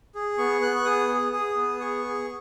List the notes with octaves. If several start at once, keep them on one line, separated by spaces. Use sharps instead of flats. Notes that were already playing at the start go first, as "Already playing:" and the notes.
G#4
B3 C#6
B3 F#6
C#6
G#4 D#6
G#4
G#4 D#6
B3
G#4 C#6
G#4